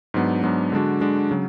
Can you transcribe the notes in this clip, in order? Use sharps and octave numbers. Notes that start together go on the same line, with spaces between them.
G#2 F#3 B3 D4
G#2 F#3 B3 D4
D3 G#3 D4 F#4
D3 G#3 D4 F#4
C#3 F#3